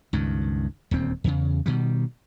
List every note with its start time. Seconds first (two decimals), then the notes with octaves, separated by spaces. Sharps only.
0.13 C#2 G2 D#3
0.91 D#1 D2 C4
1.24 E2 C#3
1.66 B2 D#3 G3